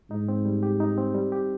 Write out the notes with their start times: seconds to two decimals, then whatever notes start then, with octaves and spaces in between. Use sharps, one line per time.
0.11 G#2 D#4
0.28 C4
0.45 G3
0.63 G4
0.80 D#4
0.98 C4
1.15 G3
1.32 G4